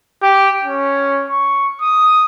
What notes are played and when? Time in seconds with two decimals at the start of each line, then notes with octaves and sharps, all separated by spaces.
0.22 G4
0.64 C#4
1.29 C#6
1.81 D#6